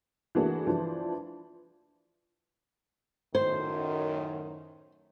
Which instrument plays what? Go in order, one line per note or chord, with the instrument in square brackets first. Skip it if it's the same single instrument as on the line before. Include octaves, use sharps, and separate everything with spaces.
[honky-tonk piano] E3 A3 A#3 D4 F#4 G#4
E3 F3 D4
[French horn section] F#2 A2 D#3 [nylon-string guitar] C5